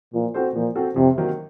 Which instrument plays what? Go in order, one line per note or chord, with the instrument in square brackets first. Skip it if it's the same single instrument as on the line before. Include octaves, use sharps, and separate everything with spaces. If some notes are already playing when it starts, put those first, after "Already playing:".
[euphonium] A#2 [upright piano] F3
[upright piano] C4 F#4 A4 C5
[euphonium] A#2 [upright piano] F3
[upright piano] C4 F#4 A4 C5
[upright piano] F2 [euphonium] C3
[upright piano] D#3 F#3 A#3